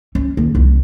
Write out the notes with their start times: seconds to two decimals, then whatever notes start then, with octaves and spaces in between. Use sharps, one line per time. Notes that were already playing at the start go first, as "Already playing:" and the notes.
0.15 C#4
0.37 D#2
0.55 C2 F2